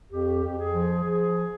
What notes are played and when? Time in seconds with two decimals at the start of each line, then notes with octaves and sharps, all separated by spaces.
0.11 F2 G4
0.43 F2
0.58 G#4
0.73 F3
1.04 F3